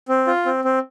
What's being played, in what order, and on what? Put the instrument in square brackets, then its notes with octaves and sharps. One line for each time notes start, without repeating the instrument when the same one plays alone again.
[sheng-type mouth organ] C4
F4
C4
C4